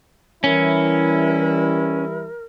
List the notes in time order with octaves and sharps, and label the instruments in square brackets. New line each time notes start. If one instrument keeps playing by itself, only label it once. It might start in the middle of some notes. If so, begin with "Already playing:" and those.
[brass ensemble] E3 G3 E4 [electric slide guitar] C#4 [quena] A#4